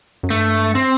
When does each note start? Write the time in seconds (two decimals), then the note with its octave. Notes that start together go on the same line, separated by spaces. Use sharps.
0.23 F#2
0.30 G2 A3
0.75 C4